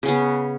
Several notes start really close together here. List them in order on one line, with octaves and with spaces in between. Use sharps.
C#3 C#4 B3